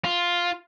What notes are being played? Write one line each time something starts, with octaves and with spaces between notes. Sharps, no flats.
F4